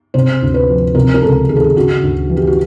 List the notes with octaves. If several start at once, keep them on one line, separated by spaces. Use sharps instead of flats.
C3 C5
D2
B4
F3
C3 A#4
A#4
C#2 A4
D#3 G#4
A4
G#4
C#3 F#4
D2
E3
G4
F#4